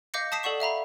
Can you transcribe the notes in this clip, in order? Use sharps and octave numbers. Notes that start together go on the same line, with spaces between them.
D#5 F5 D6 G6 A#6 C#7
A5 D#6 B6 C7 E7
A4 D5 F#5 C#6 E7
E5 F5 A#5 B5